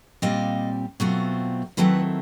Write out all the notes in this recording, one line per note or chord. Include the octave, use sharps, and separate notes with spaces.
A#2 G3 C4 D#5 F5
B2 F#3 A3 C4 F4
D#3 F#3 A3 C4 E4 A4 B4